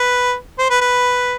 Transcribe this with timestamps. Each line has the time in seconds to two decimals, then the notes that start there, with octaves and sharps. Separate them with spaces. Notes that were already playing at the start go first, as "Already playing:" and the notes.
Already playing: B4
0.58 C5
0.70 B4
0.81 B4